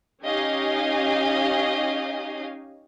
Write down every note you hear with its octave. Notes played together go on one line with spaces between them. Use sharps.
C#4 D#4 G4 D#5 F5 G#5